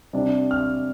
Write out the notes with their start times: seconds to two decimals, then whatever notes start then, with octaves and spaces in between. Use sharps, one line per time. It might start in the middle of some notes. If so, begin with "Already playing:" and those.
0.13 C3 G3 D4
0.51 F6